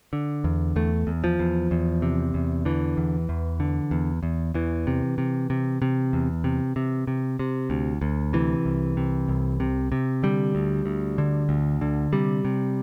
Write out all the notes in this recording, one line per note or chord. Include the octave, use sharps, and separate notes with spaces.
D3
E2
E2 A3
E2
F3
E2
E2
C3
E2
D3 E3
E2
E2
D3
E2
E2
E2 E3
C3
C3
C3
C3
E2
C3
C3
C3
C3
D2
D2
C3 E3
C2
C3
C2
C3
C3
D3 G3
D2
D2
D3
D2
D3
C3 G3
C3